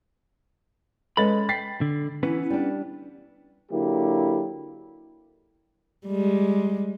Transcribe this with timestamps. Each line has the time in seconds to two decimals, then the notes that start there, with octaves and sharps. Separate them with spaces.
1.17 G#3 C#4 A4 B4 D#5 B5 A6
1.49 G5 A6 B6 C7
1.81 D3
2.23 E3 B3 C#4 E4 B4
2.50 G3 D4
3.71 D3 F#3 A#3 E4 G4
6.07 G3 G#3